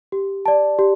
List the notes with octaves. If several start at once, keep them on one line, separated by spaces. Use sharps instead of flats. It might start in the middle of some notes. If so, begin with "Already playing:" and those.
G4
D5 A5
G4